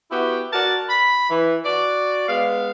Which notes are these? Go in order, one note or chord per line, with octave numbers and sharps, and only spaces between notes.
B3 E4 F#4 G4
F#4 A#4 D5 A5
B5
E3
F#4 D5
G#3 B3 F5